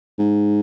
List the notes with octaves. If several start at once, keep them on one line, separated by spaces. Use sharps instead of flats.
G#2